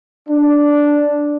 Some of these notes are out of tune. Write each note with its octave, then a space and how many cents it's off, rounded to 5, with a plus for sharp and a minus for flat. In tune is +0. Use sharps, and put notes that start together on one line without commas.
D4 -5